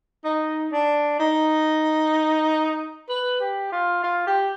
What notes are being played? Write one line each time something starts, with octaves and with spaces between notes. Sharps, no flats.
D#4
D4
D#4
B4
G4
F4
F4
G4